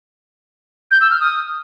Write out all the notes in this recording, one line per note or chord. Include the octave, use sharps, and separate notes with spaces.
G6
E6
F6
D#6